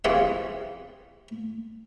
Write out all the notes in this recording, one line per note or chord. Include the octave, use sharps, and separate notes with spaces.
C3 E3 F3 G#4 F#5 C#6